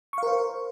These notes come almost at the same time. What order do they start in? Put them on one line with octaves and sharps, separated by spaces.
C#6 F5 A#4 C5